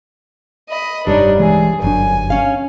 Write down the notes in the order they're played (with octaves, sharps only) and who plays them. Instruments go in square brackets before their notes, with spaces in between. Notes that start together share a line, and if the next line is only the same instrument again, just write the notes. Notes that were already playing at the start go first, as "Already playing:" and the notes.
[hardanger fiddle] D#5 B5
[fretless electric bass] F1 G2 [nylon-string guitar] G3 C#5 [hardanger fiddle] D4 D#4
[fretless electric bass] B1 E3 G#3 [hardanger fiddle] G#4
[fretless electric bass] G1 F#3 D4 [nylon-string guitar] F#2 [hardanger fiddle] G#5
[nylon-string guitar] C#4 F5